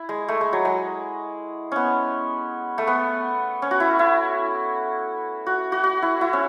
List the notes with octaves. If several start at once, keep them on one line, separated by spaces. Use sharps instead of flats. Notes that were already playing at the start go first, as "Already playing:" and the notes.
Already playing: E4
G#3
A3
G#3
F#3
G#3
B3 C#4
A3
B3
C#4
F#4
E4
E4
F#4
F#4
F#4
E4
E4
C#4